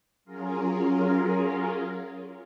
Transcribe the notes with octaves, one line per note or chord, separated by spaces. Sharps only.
F#3 C#4 F4 G#4 A#4